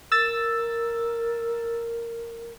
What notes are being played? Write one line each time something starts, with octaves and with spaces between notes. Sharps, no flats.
A#4 E6 A6